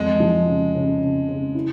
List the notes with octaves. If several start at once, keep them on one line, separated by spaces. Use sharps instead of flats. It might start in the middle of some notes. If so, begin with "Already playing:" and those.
Already playing: F2 G#3
F3
C#3
C#3
C#3
C#3
E4